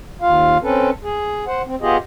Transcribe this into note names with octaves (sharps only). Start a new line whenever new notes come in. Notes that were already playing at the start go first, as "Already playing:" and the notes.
D#2 F4 F5
C4 C#4 A4 B4
G#4
C5 F#5
C4
B3 F4 G4 G#4 D#5